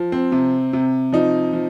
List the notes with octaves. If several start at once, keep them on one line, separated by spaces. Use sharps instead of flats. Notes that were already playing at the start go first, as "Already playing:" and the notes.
Already playing: F3
C4
C3
C3
F3 D#4
F3